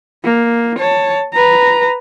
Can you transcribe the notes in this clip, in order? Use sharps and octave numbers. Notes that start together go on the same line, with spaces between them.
A#3
C#5 A5
B4 A#5